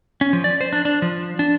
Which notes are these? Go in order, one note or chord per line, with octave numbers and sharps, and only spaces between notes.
C#4
F3
D5
C5
D4
D4
F3
D4